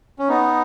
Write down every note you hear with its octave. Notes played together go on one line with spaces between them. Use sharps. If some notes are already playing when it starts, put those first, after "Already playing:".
C#4
B3 D#4